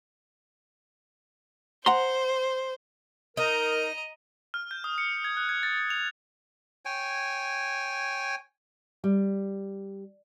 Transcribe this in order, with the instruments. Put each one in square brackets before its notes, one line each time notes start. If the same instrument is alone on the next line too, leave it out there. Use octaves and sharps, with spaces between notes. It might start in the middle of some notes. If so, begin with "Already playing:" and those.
[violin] C5 [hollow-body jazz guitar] F#5 A#5 C6
[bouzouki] D#4 [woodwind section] A#4 [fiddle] D#5 A#5
[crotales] F6
G6
D#6
C#7
G#6
F#6
G#6
A6
A6
F7
[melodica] C#5 G5 G#5
[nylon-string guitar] G3